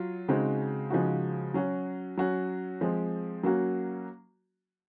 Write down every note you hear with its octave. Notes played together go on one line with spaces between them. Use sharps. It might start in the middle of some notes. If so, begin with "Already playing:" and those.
Already playing: F#3 F4
C#3 G#3 C4 D#4 F#4
C#3 F3 G#3 D#4 F#4
F#3 C#4 F#4
F#3 C#4 F#4
F3 G#3 C4
F#3 A#3 C#4 F#4